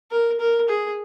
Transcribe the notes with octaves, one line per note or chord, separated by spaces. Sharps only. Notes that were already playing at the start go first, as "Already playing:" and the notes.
A#4
A#4
G#4